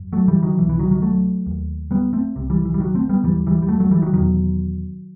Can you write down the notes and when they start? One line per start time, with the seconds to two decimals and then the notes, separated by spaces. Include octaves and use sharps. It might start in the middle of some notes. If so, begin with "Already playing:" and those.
Already playing: F#2
0.13 F#3 A3
0.28 E3 G3
0.43 D#3 F#3
0.58 B2 E3
0.62 C2
0.69 E3
0.79 D#3 F#3
0.91 D#3 F#3
1.02 F#3 A3
1.46 D#2
1.91 G3 B3
2.13 A3 C4
2.36 C2 C3
2.50 E3 G3
2.65 E3
2.74 G3
2.80 D#3 F#3
2.95 A3 C4
3.09 G3 B3
3.24 D#2 E3 G3
3.47 E3 G3
3.62 G3
3.68 F#3 A3
3.80 F#3 A3
3.91 E3 G3
4.02 D#3 F#3
4.13 E2 B2 D#3 F#3